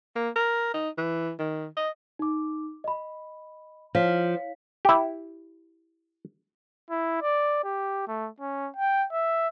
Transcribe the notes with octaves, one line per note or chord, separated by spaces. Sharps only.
A#3
A#4
D#4
E3
D#3
D#5
D#4 D6
D#5 B5
F3 C#5 F5 B6
E4 G4
E4
D5
G4
A3
C#4
G5
E5